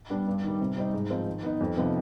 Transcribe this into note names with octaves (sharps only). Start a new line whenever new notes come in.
G3 B3 D4
G2
D#3 G3
C3
G3 C4 D#4
G#2
F3 C4 D#4
D#3
B3 D#4
F2
C3 F3 B3 D#4